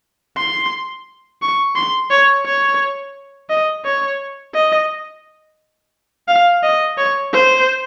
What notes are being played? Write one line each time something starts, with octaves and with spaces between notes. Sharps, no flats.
C6
C#6
C6
C#5
C#5
D#5
C#5
D#5
F5
D#5
C#5
C5